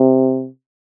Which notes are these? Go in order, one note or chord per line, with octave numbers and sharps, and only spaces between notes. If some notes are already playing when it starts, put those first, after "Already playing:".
Already playing: C3